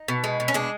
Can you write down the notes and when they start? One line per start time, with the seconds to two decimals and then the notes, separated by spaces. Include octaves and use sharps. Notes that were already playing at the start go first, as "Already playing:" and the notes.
Already playing: D#4
0.08 B2
0.24 G#3
0.40 B2
0.48 C#4
0.54 G#3 D4